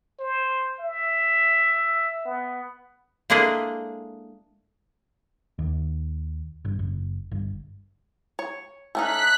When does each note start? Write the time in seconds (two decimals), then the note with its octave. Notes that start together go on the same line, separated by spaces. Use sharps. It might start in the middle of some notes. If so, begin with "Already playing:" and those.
0.19 C5
0.79 E5
2.25 B3
3.30 G#3 A#3 D4 E4 G#4 A4
5.59 D#2
6.65 G1
6.79 F#1
7.31 G1
8.39 C#5
8.95 A3 C#4 D#4 F#6 B6